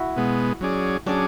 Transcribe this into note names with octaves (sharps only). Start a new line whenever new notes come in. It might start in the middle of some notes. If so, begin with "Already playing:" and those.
Already playing: E4 F#4
B2 G#3 B3
F#3 C#4 G#4 D5
F#3 C#4 D4 G#4 D5